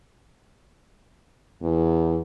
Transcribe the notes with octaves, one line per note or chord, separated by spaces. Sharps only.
E2